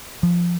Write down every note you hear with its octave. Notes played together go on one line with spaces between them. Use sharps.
F3